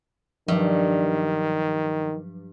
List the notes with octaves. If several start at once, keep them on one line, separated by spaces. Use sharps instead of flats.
G2 D#3 F3 F#3